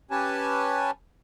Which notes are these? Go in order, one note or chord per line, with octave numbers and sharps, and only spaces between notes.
C#4 G4 B4 C#5 G#5 A5